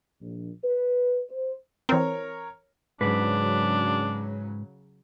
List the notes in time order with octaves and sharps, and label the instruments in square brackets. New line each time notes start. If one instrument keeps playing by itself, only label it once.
[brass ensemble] A#1
B4
C5
[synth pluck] E3 C4 [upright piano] A#4 C#5
[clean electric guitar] G#2 B4 [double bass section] C#3 F#3 [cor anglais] D4